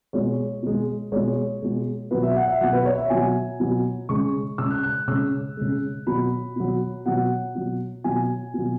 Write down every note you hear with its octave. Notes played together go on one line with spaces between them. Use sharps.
B2 G#3 C#5
B2 G#3
B2 G#3 C#5
B2 G#3
B2 F#3 B4
E5
F#5
E5
B2 F#3 F#5
B4
C#5
E5
B2 F#3 G#5
B2 F#3
C#3 G#3 C#6
C#3 G#3 E6
F#6
F#6
C#3 G#3 E6
C#3 G#3
B2 F#3 B5
B2 F#3
B2 F#3 F#5
B2 F#3
B2 F#3 G#5
B2 F#3